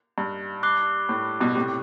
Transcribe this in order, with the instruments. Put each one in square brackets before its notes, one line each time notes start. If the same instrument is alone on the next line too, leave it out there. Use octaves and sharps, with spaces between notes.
[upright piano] G2
[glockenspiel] D6 F#6 C7 G7
[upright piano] A2
G2 B2
A2 C3